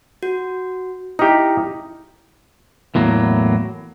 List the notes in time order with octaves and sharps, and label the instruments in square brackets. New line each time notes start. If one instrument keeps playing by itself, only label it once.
[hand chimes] F#4
[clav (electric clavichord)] D#4 G4 [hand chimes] E4
[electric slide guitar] E2 A2 F#3 A#3